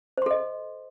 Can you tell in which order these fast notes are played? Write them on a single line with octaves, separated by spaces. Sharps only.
C5 C6 A4 D#5